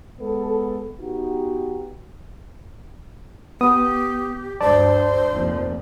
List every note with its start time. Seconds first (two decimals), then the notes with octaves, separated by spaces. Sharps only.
0.20 G#3 B3 A4
1.01 B3 D#4 F#4 G4
3.61 B3 G4 D#6
4.61 D2 G2 C5 D5 A5
5.32 F1 D#2 F3